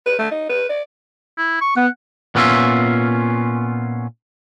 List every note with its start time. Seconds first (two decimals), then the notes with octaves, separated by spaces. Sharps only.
0.06 B4
0.19 A3
0.31 D#4
0.49 B4
0.69 D5
1.38 E4
1.61 C#6
1.77 B3 F#5
2.35 A#2 B3 C#4 E4 F4 E5